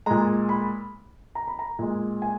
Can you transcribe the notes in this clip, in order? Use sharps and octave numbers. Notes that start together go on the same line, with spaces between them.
A#2 G#3 A#5
B5
A#5
B5
A#5
A#2 G#3
G#5